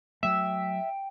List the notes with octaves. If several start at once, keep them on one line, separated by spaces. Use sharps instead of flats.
F#3 A3 E5 G5